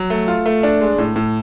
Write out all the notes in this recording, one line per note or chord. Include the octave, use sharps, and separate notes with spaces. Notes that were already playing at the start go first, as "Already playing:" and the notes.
Already playing: F#3
A3
F4
A3
D4
G#3
A2
A2